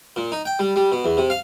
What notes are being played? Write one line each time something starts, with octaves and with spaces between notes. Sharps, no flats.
A#2
D#4
G5
G3
G3
B2
E2
C3
F5